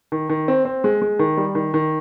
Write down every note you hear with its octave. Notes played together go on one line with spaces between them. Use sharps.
D#3
D#3
C4
C4
G#3
G#3
D#3
G3
D#3
D#3